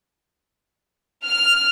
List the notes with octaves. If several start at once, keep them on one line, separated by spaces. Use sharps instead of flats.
F6